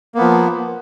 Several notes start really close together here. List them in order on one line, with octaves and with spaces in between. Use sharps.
A#3 B3 F3